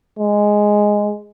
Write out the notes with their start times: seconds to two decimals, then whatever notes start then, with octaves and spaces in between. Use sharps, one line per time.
0.19 G#3